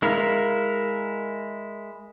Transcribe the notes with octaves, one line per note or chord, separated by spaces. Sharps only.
G#3 E4 A#4 F5